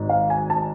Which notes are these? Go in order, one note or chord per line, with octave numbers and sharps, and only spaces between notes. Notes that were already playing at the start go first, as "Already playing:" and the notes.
Already playing: G#1 G#2
F5
G#5
A5